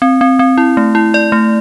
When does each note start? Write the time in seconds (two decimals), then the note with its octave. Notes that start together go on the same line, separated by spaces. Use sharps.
0.02 C4
0.21 C4
0.39 C4
0.58 E4
0.77 A3
0.95 E4
1.14 D5
1.32 A3